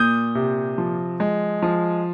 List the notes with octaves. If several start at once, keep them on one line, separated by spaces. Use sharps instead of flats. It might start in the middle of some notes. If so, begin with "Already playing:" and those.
Already playing: A#2 D#6 G6
C3
F3
G#3
F3